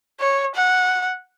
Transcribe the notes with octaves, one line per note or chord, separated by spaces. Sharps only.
C#5
F#5